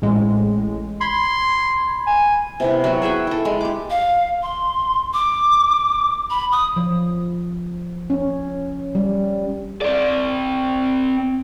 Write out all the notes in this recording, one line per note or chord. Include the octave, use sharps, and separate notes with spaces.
A1 A2 G#3
B5 C6 G#6
G#5
C3 B3 E4
F#3 F#4
G#4 E5 F#5 G5
E4 A4
G#3
G4 D6
F5
C6
D6
B5
D#6
F3
C#4
G3
C4 D5